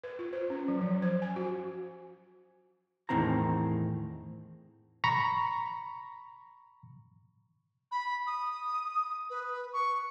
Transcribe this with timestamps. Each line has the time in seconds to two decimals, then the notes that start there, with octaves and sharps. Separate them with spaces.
0.04 B4
0.19 F4
0.33 C5
0.50 C#4
0.68 F#3
0.81 F3
1.02 C5
1.22 G#5
1.36 F#4
3.09 E2 A2 D#3 C4 E4 A#5
5.04 A#5 B5 C#6
7.91 B5
8.27 D#6
9.30 B4
9.73 C#6